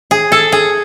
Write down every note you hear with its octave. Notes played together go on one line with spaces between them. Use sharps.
G#4
A4
G#4